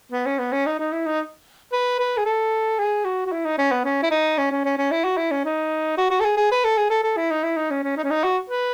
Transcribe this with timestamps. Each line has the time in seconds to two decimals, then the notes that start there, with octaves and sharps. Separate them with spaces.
0.12 B3
0.26 C#4
0.39 B3
0.52 C#4
0.66 D#4
0.79 D#4
0.93 E4
1.06 D#4
1.72 B4
1.99 B4
2.17 G#4
2.25 A4
2.79 G#4
3.05 F#4
3.26 F#4
3.32 E4
3.45 D#4
3.58 C#4
3.71 B3
3.85 C#4
4.03 E4
4.11 D#4
4.38 C#4
4.51 C#4
4.65 C#4
4.77 C#4
4.91 E4
5.04 F#4
5.17 E4
5.31 C#4
5.45 D#4
5.97 F#4
6.10 F#4
6.20 A4
6.25 G#4
6.37 G#4
6.51 B4
6.64 A4
6.77 G#4
6.90 A4
7.04 A4
7.17 E4
7.31 D#4
7.44 E4
7.57 D#4
7.71 C#4
7.84 C#4
7.97 D#4
8.04 C#4
8.11 D#4
8.24 F#4
8.50 B4